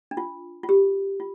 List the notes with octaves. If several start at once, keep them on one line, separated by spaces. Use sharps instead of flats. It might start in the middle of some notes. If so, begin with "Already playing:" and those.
D4
F4
F4
G4
F4